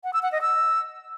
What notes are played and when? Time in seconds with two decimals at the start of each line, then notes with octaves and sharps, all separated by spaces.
0.04 F#5
0.13 E6
0.23 F#5
0.32 D#5
0.42 E6